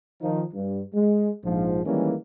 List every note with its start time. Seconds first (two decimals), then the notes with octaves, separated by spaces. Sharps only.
0.22 D#3 F3 D#4
0.54 G2
0.93 G#3
1.44 A#1 G#2 F3
1.84 D#3 E3 G3 G#3 A#3 C#4